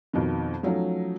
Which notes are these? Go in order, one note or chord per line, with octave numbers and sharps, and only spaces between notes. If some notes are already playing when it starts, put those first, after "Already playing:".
F2 B2 D#3
F3 F#3 A3 C#4 D#4